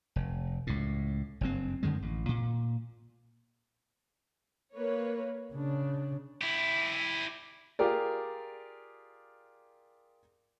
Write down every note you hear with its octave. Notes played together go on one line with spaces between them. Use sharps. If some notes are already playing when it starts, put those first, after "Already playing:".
F1
C#2 A2
F#1 G2 C4
F#2 D3 D#3 G#3
A1
A#2
A#3 B4 C#5
C#3 D4
E4 G4
F4 G4 G#4 A#4 D5